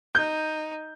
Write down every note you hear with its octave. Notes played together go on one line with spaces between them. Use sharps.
D#4 G6